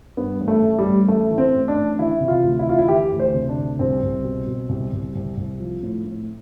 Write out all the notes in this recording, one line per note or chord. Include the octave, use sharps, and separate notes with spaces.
G2 B3
A1
A3
A1
G3
A1
A1 A3
E3
C4
A1
D4
A1
E3 E4
C3
F4
D2
E4
E3 F4
E4
E3 G4
D2
C5
C3
D4
D2
C2 C4
C2
B2
B2
C2
C2
C2
C2
F3
A2
A2